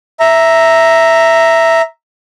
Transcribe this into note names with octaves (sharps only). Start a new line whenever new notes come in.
E5 A#5